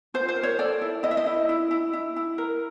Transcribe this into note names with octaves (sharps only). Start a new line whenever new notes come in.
F4 C5
C5
A#4
C#5
A4 D5
E4
E4 D#5
E5
D#5
E4
E4
E4
E4
E4
A#4